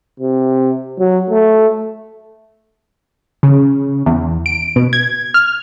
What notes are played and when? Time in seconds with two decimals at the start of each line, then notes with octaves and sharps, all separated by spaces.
0.20 C3
0.99 F#3
1.30 A3
3.43 C#3
4.06 E2
4.46 D7
4.76 B2
4.93 G#6
5.34 F6